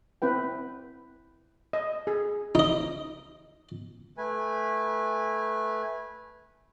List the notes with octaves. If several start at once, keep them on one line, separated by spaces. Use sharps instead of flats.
C4 E4 B4 G5
D#5
G#4
D#4 D#5
A3 B4 G#5